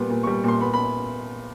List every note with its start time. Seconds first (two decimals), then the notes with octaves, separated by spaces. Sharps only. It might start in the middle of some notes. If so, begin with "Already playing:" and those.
Already playing: A#2 G3 B3
0.10 A#2
0.23 G3 C#6
0.44 A#2 C6
0.61 B3 B5
0.74 B5